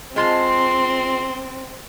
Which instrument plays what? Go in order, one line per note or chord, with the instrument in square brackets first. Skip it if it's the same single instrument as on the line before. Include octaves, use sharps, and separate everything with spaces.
[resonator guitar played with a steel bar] G#3 F4 A5 [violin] C4 [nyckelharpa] C6